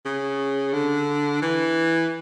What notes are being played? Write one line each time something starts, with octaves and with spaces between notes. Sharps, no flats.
C#3
D3
E3